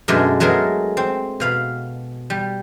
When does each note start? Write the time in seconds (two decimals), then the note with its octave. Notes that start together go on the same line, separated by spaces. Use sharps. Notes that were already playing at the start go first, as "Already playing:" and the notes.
0.08 F#2 B2 G#3 A3 D4 D5
0.40 F#3 G#3 A3 B3 G#4 A#4
0.97 C4
1.40 B2 F5 B5
2.30 G3